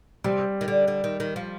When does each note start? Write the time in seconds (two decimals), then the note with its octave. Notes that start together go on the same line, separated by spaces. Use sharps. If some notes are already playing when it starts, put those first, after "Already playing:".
0.24 C3 G3
0.61 D#3
0.68 D3
0.88 D3
1.04 D#3
1.20 D#3
1.36 F3